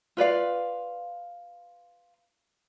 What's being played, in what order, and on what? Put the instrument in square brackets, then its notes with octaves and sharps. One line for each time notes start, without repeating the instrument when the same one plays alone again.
[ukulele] F4 B4 D5 F5